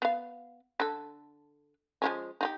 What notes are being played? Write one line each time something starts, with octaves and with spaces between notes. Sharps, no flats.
B3 F5
D3 A4
F3 G#3 C#4
D#4 F4 G4